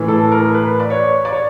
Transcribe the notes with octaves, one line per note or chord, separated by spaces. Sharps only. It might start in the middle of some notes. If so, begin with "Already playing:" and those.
Already playing: A2 E3
A4
A#4
B4
D5
C#5
D5
C#5